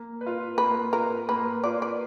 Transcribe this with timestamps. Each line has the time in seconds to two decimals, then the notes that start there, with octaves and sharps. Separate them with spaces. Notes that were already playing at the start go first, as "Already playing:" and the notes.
Already playing: A#3
0.21 B4
0.26 F4
0.58 A#3 B4
0.92 F4 A#4 B4
1.29 A#3 B4
1.64 F4 B4 D5
1.82 D5